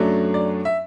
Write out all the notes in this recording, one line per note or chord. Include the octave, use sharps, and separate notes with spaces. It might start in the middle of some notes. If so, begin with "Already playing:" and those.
Already playing: F#2 F#3 A3 D4
D5
E5